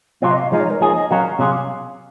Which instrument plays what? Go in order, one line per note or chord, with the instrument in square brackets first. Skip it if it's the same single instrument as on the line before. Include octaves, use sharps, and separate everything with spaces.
[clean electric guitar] C3 F#3 C4 F4 [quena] F5
[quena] D#5
F5
[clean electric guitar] F3 G#3 D#4 [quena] D#5
[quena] C#5
A#4
[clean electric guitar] F3 A#3 D#4 G#4 [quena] C#5
[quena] D#5
[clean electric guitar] F#3 C#4 F#4 A#4 [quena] F5
[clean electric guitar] C3 F#3 C#4 G#4 [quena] F5